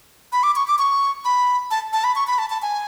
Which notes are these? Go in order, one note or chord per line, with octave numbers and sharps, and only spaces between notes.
B5
D6
C#6
D6
C#6
B5
A5
A5
B5
C#6
B5
A5
A5
G#5